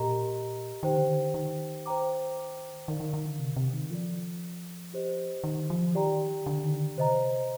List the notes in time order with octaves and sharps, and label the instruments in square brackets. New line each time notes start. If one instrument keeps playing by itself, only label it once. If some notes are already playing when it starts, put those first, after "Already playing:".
Already playing: [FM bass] A#2 [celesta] G4 A#4 D#5 A#5
[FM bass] D#3 [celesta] G4 C5 G5
[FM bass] D3
D#3
D#3
[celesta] C5 G5 A#5 D6
[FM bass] D#3 [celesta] A#4 D5 F5
[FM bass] D#3
D#3
D3
C3
C3
D#3
[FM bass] F3 [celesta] F4 A4 D5
[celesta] G4 C5 D#5
[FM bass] D#3
F3
[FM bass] D#3 [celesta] G4 D5 G5 A#5
[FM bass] D3
D#3
D3
[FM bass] C3 [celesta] C5 D#5 A#5